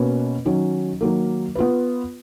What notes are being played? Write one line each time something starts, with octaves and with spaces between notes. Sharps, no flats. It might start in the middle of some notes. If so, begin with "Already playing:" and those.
Already playing: B2 A#3 C#4 F#4 B4
D#3 F#3 C#4
D#3 F#3 A#3
B3 F4 B4